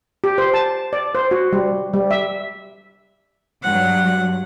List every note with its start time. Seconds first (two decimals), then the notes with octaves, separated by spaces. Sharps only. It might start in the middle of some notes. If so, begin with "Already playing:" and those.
0.24 G4
0.38 C5
0.54 A5
0.93 D5
1.15 C5
1.31 F#4
1.53 G3
1.94 G3
2.11 E5
3.63 G2 F#3 F#5